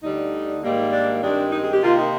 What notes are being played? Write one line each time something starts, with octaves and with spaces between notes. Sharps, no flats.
D2 D3 G3 D#4
G#2 D#3 G3 A#3
D4
G2 D#3 G#3 C4 D4
D#4
G#4
G4
C3 D#3 A#3 F4
D#4